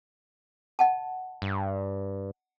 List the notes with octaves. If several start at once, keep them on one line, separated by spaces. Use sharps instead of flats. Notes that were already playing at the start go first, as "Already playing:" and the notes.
D#5 F#5 A5
G2